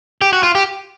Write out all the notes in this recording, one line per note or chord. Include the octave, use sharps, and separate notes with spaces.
G4
F#4
F4
G4